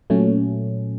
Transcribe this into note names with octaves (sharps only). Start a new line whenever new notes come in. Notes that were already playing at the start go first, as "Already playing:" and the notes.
A#2 F#3 A3 C#4